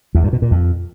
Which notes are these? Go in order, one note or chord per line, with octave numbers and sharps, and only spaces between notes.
E2
G2
B2
A#2
F2